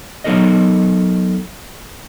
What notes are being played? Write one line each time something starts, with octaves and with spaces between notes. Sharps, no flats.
F#3 B3 D#4 A4 A#4 D#5